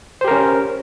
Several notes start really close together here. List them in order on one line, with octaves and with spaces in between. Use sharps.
C5 G4 A#4 C#4